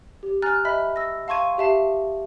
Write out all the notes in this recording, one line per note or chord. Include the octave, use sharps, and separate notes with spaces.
G4
G#5 A#5 F6 F#6 A6
D#5 E5 B5 B6
E6 A#6
F5 A5 C6 C#6 G#6 D#7
G4 E5 A5 C7